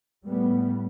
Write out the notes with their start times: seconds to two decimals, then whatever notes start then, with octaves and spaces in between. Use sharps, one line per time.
0.25 A2 G3 B3